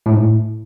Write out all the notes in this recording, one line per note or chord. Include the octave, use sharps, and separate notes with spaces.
A2
G#2
A2